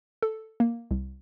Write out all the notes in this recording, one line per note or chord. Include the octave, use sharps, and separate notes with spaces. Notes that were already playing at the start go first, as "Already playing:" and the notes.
A4
A#3
C2